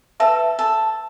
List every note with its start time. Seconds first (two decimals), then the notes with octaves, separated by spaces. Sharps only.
0.20 A4 B4 E5 A5
0.59 A4